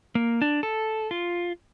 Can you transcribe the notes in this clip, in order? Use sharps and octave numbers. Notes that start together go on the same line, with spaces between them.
A#3
D4
A4
F4